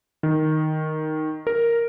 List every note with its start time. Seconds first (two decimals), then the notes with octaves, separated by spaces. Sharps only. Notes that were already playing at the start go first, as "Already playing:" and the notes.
0.23 D#3
1.47 A#4